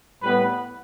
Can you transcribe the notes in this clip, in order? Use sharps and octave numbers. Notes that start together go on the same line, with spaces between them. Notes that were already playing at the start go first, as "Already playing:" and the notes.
A2 G3 B3 B4